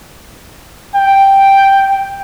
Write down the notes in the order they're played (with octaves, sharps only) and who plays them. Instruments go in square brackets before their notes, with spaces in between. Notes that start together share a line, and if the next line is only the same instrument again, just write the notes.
[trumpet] G5